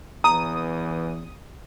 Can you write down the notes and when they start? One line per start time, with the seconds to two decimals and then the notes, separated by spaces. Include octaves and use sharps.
0.24 E2 E3 A#5 D#6